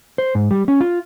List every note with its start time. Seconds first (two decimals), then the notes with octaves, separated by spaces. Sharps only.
0.18 C5
0.35 G#2
0.51 G3
0.68 C#4
0.80 F4